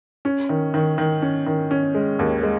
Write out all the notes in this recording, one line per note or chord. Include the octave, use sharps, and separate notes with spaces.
C#4
D#3
D#3
D#3
C#4
D#3
C#4
G#3
D#2
G#3